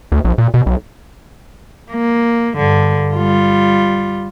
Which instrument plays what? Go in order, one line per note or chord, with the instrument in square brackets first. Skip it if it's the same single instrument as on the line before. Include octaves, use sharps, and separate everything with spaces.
[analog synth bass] D2
A#1
A#2
B2
B1
[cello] A#3
G2 D3
G3 F4